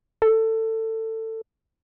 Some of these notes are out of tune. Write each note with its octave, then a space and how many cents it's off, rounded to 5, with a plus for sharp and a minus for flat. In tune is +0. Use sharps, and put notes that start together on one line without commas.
A4 +20